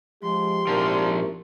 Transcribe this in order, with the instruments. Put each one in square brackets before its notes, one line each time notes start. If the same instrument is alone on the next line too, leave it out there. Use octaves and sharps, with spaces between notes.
[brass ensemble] F3 G#3 [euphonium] G4 [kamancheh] C6
[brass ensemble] G#1 E4 A#4 [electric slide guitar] A#2 F3